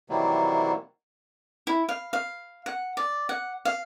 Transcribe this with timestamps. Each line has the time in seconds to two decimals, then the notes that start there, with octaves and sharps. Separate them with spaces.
0.09 C3 D#3 E3 F#3 G3 A#3
1.67 E4
1.89 F5
2.13 F5
2.66 F#5
2.97 D5
3.29 F#5
3.65 F5